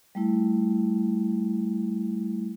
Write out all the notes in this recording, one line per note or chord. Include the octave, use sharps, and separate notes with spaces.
G3 A3 E4